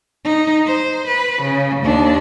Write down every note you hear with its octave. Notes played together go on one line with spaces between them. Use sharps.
D#4
C5
B4
C#3
D#2 D4